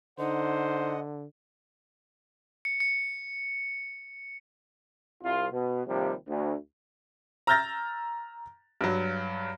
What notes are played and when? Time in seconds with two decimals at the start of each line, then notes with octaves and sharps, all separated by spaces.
0.19 D3 D#4 C5 D#5 F#5
2.65 C#7
2.80 C#7
5.23 C2 F4
5.52 B2
5.87 D#2 C3 F3 G3
6.28 D2
7.47 A#5 E6 F6 G6 A6 A#6
8.81 G2 F#3